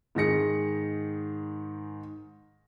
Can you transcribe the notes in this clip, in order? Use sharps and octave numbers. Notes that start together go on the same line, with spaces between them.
G#2 D#3 G#4 A#6 C#7